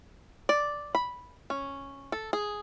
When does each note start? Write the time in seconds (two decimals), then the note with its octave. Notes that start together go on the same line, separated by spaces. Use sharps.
0.49 D5
0.95 B5
1.50 C#4
2.12 A4
2.33 G#4